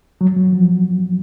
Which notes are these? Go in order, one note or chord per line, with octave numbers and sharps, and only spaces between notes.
F#3
F#3
F3